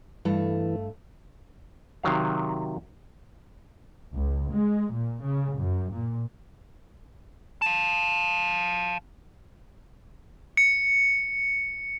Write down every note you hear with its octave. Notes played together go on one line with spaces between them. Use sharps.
G2 E3 A3
C3 D#3 F#3 F5
C#2
G#3
A#2
C#3
F#2
A#2
F5 A5
C#7